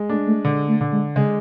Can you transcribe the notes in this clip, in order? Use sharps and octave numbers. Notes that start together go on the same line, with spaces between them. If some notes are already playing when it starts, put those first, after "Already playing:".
Already playing: G#3
A3 D4
A3
D3
A3
D3
G#3
C#3 G#3